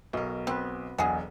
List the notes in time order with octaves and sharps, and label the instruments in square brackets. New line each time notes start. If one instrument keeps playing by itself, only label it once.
[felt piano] B1 [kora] B2 A#4
[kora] B3 B4 [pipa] C4
[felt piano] E1 B1 [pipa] F#4 G#4